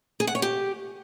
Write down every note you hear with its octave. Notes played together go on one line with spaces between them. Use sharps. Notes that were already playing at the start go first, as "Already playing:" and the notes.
G#4
F#5
C#5
G4